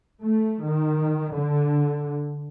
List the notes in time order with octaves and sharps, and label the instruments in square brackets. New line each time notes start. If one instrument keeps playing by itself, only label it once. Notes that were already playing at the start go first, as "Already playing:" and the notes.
[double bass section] A3
D#3
D3